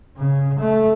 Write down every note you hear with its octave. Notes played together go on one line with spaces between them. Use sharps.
C#3
A3